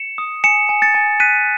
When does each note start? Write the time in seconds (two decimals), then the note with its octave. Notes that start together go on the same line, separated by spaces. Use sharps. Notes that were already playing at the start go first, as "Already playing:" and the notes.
Already playing: C#7 E7
0.18 D#6
0.44 G#5 C#7 E7
0.69 G#5
0.82 A6 C#7
0.95 G#5
1.20 F#6 B6 D#7